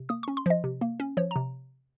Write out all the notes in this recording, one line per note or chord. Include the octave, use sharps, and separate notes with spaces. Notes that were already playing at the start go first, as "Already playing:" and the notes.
Already playing: C3
A#3 D#6
C#4 C#6
C6
F3 D#5
C3
A#3
C#4
F3 C#5
C3 A#5